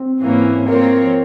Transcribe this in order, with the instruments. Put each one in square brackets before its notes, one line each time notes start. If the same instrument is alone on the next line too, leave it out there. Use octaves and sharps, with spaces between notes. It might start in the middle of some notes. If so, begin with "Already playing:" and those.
Already playing: [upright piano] C4
[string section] G#2 E3 A#3 C#4
[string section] F3 C4 F4 A#4 C#5 [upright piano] A#3